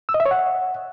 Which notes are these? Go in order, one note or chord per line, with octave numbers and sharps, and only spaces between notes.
E6
D#5
E5
C#5
F#5